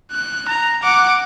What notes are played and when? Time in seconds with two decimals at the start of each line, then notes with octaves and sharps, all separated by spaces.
0.12 F#6
0.49 A#5
0.83 F#5 D6